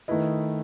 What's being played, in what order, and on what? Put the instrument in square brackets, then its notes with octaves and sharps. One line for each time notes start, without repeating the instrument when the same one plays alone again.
[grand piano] D#3 A3 E4 B4 D#5